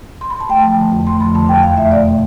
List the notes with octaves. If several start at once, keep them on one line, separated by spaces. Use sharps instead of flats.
C6
B5
A5
A3 G5
F3 A5
D3
F2
A3 C6
F3 B5
D3 A5
F2 G5
E2 F5
A3 E5
B2 D5